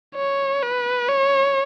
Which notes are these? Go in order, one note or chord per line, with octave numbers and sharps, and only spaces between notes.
C#5
B4
C#5